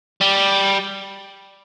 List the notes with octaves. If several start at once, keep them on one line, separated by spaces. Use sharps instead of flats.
G3